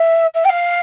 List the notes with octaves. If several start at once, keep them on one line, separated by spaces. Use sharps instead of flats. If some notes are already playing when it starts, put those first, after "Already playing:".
Already playing: E5
E5
G5
F5